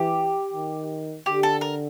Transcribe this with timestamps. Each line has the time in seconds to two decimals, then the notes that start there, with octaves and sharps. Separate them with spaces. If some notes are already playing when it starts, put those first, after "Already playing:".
Already playing: E3 G4
0.53 D#3
1.26 D3 G4
1.43 A4
1.61 A#4